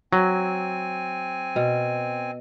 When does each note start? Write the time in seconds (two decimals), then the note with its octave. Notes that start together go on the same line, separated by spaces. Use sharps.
0.13 F#3 C4 G#5
1.56 B2